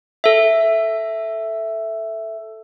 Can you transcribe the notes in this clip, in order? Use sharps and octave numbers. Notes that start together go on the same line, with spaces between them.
A4 E5